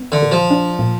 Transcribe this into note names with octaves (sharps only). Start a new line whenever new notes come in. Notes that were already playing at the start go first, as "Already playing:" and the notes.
Already playing: B3
D3
A#2
F3
D4
A#2